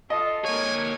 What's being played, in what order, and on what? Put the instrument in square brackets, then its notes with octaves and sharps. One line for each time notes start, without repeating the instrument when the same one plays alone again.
[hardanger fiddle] F4 A4 [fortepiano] D#5
[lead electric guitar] A#3 C#5 [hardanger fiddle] A#4 C#6 [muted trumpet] G#5